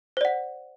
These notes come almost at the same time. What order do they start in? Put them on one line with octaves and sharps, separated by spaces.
C5 D5 F#5